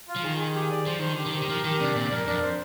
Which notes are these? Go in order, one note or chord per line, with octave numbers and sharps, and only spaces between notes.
F4
F3
D#3 G#4
G#4
G4
D5
F3 C5
D#3 C5
D3 G4
D#3
G4
D#3
F3 A#4
D#3 G4
C3 D4
A#2 D5
F2 A#4
F2 D4
C5